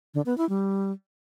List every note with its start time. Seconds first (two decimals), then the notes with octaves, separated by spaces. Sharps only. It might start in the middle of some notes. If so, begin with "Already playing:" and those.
0.14 D3
0.26 B3
0.38 E4
0.49 G3